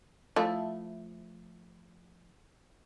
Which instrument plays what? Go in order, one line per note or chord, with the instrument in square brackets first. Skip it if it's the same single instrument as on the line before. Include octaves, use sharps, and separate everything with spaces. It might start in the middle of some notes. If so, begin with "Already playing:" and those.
[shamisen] F3 A3 E4